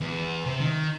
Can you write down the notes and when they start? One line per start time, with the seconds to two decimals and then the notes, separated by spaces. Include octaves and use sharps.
0.01 E2
0.46 C3
0.61 D#3